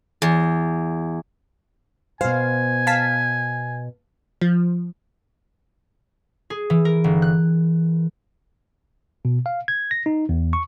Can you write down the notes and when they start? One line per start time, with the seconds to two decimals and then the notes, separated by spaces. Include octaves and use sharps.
0.22 E2
2.21 B2 C5 F5 G#5
2.87 F5 A5 B6
4.41 F3
6.50 G#4
6.70 E3
6.85 A#4
7.04 G1
7.22 F#6
9.25 B2
9.46 F5
9.68 G#6
9.91 A#6
10.06 D#4
10.29 E2
10.53 C#6